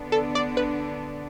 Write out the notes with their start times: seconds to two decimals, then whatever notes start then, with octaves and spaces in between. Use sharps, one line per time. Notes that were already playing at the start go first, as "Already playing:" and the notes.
Already playing: D3 B3 D4
0.12 A4
0.35 D5
0.57 B4